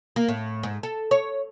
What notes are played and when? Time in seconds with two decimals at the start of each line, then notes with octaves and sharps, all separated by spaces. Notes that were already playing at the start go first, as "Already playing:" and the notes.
0.16 A#3
0.28 A2
0.63 G#2
0.83 A4
1.11 C#5